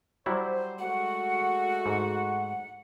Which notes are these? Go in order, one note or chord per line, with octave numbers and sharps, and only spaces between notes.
F#3 G3 E4 C5
G#3 A3 F#4 F#5
G#2